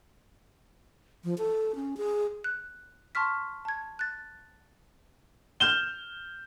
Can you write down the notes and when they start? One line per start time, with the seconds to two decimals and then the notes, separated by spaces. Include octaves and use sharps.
1.24 F3
1.38 A4
1.75 C#4
1.97 G#4
2.44 F#6
3.15 A5 C6 C#6 F6 B6
3.65 A5 G#6
3.99 F#6 A6
5.60 F6 G6 E7 G7